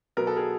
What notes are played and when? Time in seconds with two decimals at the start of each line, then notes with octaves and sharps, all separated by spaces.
0.17 B2 F#3 B3 A#4
0.27 A4
0.37 G#4 A#4